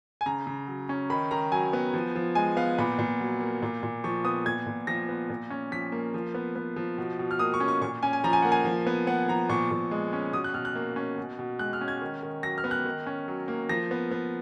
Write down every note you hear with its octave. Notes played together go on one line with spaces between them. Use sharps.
G#5
C#3 A#5
C#3
F#3
C#4
D#3 B5
D#3 A#5
F#3 G#5
B3
F3
F3
G#3 G#5
B3 F5
A#2 B5
A#2
F#3
A#3
A#2
A#2
F3 C#6
B3 D#6
A#2 G#6
A#2
F3 A#6
B3
A#2
C#4
F3 B6
A#3
F3
B3
B3
F3
B2
B2
F6
A#3 D#6
C#6
C#4
C#6
A#2 C#6
C#4 G#5
G#5
F3 A#5
G#5
A#3 F#5
G#5
F3
B3
B3 F#5
F3 A#5
A#2 C#6
A#2
G#3
C#4
B2 D#6
F#6
B2 F6
F#6
A#3
C#4
B2
B2
G#3 F#6
F6
C#4
G#6
D#3
D#3
F#3 A#6
F6
B3
F#6
D#3
C#4
F#3
A#3
F3 A#6
B3
B3